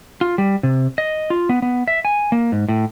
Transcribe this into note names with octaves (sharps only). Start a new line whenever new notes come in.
F4
G3
C3
D#5
F4
B3
B3
E5
G#5
A#3
G#2
A2